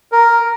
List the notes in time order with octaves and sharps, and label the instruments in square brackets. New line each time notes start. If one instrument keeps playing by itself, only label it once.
[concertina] A#4